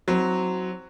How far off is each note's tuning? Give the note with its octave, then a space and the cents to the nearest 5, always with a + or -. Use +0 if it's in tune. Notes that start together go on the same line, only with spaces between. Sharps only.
F#3 +0 C4 +0 E4 -45